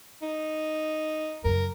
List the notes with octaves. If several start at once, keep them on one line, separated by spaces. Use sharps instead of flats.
D#4
F#1 F#2 A#4